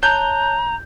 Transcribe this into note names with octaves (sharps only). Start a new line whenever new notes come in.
C#5 A5 A#5 F#6 G6